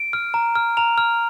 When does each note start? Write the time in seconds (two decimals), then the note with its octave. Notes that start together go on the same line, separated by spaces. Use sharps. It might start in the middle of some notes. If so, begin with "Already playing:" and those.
Already playing: D7
0.13 F6
0.34 A#5
0.55 F6
0.77 A#5 F7
0.98 F6